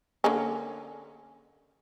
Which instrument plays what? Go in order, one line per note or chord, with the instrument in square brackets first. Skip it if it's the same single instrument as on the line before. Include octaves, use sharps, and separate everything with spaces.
[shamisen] D3 A#3 C#4